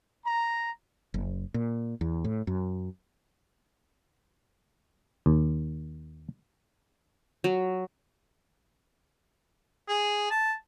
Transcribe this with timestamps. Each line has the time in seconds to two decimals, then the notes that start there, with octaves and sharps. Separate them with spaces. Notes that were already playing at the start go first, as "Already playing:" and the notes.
0.25 A#5
1.14 F#1
1.54 A#2
2.01 E2
2.24 A2
2.47 F#2
5.26 D#2
7.44 F#3
9.89 G#4
10.31 A5